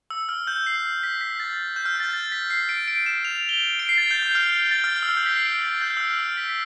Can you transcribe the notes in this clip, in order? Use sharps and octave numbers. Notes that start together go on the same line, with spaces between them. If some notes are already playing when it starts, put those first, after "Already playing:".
E6
F6
G6
C7
B6
B6
A6
G6
F6
F6
A6
G6
A6
B6
C7
D7
D7
E7
F7
F7
G7
D7
C7
A6
G6
G6
F6
A6
F6
F6
E6
F6
G6
B6
C7
D7
A6
G6
E6
F6
F6
B6
B6